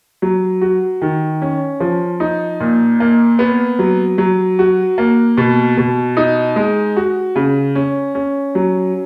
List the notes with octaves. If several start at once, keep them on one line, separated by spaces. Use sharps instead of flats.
F#3
F#4
D#3
C#4
F3
D#4
A#2
A#3
B3
F#3
F#3
F#4
A#3
B2
B2
D#4
G#3
F#4
C#3
C#4
C#4
F#3